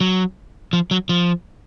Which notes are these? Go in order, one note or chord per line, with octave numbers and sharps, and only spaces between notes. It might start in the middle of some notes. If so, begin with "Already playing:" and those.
F#3
F3
F#3
F3